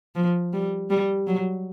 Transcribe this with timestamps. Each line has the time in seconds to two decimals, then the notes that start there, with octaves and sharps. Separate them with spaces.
0.15 F3
0.53 G3
0.90 G3
1.27 F#3